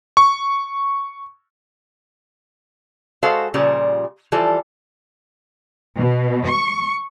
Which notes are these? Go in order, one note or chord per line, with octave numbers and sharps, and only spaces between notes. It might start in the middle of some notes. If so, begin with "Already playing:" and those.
C#6
G#3 F#4 A4 C5 F5
A#2 C#3 F3 G3
E3 F3 G3 A4
B2
C#6